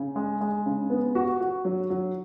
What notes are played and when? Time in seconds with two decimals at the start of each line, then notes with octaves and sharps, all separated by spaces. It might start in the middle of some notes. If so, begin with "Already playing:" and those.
Already playing: C#3
0.16 G#3
0.41 G#3
0.66 C#3
0.90 B3
1.15 F#4
1.41 F#4
1.65 F#3
1.90 F#3